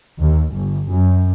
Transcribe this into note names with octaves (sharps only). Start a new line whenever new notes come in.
D#2
G1
F#2